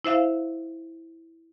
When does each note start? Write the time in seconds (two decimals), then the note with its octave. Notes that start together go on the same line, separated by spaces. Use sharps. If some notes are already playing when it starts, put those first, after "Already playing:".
0.05 E4 C5 E5 F5